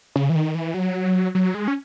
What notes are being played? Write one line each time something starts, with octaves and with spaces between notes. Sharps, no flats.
C#3
E3
D#3
E3
F#3
F#3
G#3
C#4